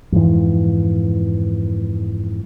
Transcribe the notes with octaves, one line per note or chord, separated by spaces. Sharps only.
F2 G#2 E3